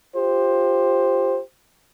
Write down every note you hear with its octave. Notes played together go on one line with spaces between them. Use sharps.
F4 G4 C5